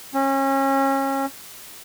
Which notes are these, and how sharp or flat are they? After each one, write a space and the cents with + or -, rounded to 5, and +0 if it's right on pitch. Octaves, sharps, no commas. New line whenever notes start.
C#4 -30